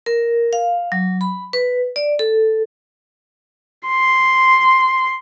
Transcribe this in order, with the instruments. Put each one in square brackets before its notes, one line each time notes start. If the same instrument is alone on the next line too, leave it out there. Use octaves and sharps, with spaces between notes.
[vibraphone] A#4
F5
F#3
B5
B4
D5
A4
[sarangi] C6